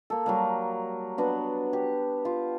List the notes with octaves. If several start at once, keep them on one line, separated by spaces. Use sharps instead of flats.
A#3 A4
F#3 G3 A#3
B3 D4 F#4
G4
F4